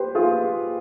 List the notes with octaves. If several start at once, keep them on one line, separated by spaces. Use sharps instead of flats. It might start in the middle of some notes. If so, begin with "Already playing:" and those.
Already playing: G4 B4 C5
F4 G#4